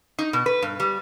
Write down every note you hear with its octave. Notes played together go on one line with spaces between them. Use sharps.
D#4
B2
B4
G2
G3